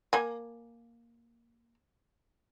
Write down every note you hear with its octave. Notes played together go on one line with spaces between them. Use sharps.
A#3 G#5